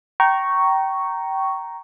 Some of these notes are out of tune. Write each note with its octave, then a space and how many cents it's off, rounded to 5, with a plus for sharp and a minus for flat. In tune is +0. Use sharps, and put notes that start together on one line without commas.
G5 -25 A#5 +0 C#6 +0